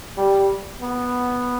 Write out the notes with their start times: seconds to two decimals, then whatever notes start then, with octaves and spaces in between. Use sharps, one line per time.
0.18 G3
0.82 B3